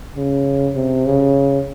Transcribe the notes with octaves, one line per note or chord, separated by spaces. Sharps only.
C#3
C3
C#3